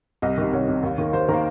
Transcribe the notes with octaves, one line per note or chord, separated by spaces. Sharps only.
C2 D#5
C3 D#3 D#5
C2 C#5
C3 D#3
D#2
D#3 A#3
D#2 C5
D#3 A#3 A#4